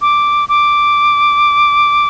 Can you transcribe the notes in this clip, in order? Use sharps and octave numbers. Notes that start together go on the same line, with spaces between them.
D6
D6